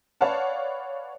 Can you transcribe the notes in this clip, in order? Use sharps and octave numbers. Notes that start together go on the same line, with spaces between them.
B4 C#5 D5 F5 F#5 A5